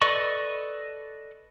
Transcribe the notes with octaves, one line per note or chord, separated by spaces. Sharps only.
A4 B4 D5 D#5 C#6